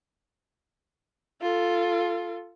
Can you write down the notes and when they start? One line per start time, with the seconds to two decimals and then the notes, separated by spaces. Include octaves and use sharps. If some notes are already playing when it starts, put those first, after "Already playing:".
1.42 F4 A4